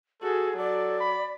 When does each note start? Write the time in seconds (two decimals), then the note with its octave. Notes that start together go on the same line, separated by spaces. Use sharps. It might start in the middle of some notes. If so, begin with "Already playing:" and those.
0.22 F#4 G#4 A4
0.57 F#3 A4 D5
1.00 B5